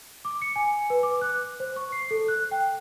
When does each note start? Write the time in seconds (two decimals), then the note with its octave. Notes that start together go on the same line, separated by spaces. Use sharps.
0.25 D6
0.42 C#7
0.56 G#5
0.90 B4
1.03 D6
1.21 F#6
1.60 C5
1.76 C#6
1.92 C7
2.11 A4
2.28 F#6
2.51 G5